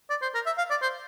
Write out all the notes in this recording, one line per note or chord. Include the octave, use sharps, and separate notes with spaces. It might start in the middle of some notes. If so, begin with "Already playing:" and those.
D5
C5
A#4
E5
F5
D5
C5